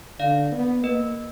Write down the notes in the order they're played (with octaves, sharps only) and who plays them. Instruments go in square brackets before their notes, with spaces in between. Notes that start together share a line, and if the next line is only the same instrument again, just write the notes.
[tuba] D3 [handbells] D5 F5
[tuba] B3
[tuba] A#3 [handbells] B4 D#5